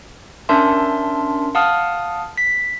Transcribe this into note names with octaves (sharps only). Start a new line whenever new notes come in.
C#4 D4 A#4 E5 A5 C6
F5 F#5 A5 D#6 F6
B6